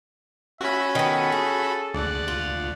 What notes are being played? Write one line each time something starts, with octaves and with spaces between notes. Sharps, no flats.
C#4 F#4 E5 B5
D#3 B3 A4
G#4
D2 D5 F#5
F4